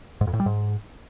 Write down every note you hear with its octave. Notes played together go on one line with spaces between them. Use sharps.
G#2
F2
A2
G3
G#2